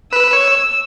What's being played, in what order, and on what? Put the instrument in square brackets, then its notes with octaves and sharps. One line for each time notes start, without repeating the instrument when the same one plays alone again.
[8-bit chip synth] B4 [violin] E6
[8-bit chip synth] C#5